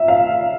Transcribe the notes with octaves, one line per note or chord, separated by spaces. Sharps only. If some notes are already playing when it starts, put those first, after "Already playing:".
Already playing: E5
F5